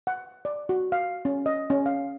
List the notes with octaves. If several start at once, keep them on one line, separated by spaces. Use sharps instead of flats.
F#5
D5
F#4
F5
C#4
D#5
C#4
F5